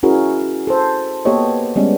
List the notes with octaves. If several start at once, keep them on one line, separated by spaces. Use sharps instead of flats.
C#4 E4 F#4 G#4 A#4
A4 C5
A#3 B3 G4 A4 C#5 D#5
G3 G#3 B3 C#4